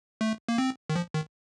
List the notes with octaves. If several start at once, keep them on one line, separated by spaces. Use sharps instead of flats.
A3
A#3
C4
D#3
F3
D#3